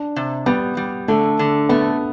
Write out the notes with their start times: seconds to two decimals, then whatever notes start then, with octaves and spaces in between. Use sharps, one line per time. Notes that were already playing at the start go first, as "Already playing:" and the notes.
Already playing: D4
0.16 C3
0.46 G3 B3
0.77 G3
1.08 D3 A3
1.39 D3
1.69 A3 B3